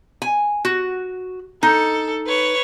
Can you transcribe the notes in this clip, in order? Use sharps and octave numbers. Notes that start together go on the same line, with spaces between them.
G#5
F#4
D#4 A4
B4 C#5